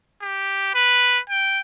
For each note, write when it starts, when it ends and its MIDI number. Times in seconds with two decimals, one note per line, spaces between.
0.22 0.73 67
0.75 1.20 71
1.30 1.60 79